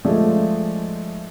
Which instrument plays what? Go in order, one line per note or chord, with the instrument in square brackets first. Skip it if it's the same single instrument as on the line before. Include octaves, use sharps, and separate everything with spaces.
[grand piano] F3 G#3 A3 G#4 D5